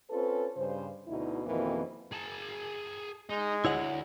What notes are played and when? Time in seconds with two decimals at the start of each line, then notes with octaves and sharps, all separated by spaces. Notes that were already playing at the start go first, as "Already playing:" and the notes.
0.10 C4 C#4 F4 A4 B4
0.56 G2 C#3 C5
1.08 D2 B2 D#4 E4
1.46 F2 B2 D#3 E3 A#3 C4
2.12 G#4 A5
3.30 G#3 D#4
3.65 D2 E4 C#5 F#5